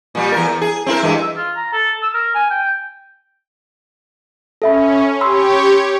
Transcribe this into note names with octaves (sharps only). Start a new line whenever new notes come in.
A#2 G3
E2 A#4
E2
G#4
C4 E4 A#4
G2 E3 G#3
E6
F4
A#5
A4
E6
A#4
G#5
G5
C#4 A4 E5 B5
G4 C#5 B5 C6 E6